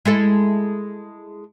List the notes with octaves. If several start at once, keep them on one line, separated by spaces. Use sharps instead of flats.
G#3 E4 A4